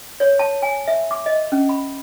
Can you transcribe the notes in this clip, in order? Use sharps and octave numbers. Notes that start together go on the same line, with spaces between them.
C#5
A5
G#5
E5
D6
D#5
C#4
B5